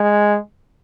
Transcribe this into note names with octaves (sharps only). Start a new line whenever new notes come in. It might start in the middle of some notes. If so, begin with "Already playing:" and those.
Already playing: G#3